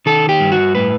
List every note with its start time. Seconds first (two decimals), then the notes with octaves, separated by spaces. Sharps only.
0.06 D#3 A4
0.29 G4
0.40 G2
0.52 F#4
0.75 A2 B4